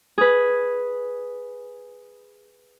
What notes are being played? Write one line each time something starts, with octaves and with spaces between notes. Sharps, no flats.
G#4 B4